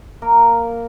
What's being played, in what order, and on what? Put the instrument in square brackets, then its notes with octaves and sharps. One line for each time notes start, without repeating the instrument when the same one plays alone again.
[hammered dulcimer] A#3 A#4